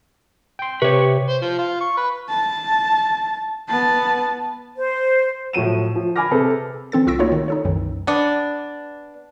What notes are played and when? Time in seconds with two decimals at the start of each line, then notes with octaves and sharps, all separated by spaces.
0.59 G5 C6
0.82 C3 G4 B4 C#5 C#6
1.28 C5
1.42 F3
1.58 F4
1.80 C#6
1.97 B4
2.30 A5
3.69 B3 A5
4.77 C5
5.53 A2 F3 F#3 D#7 E7
5.96 F3
6.16 G#5 B5 D6 F6 A#6
6.31 C3 G#4 A4 B4
6.92 E3 C4 A4 A6
7.06 C2 F4 C#6 E6 A#6 D7
7.19 A3 A#3 D#4 F4 F#4 C#5
7.32 D#3
7.48 D#4 A4 C#5
7.64 C2 F#2 D#3 E3
8.07 B3 D4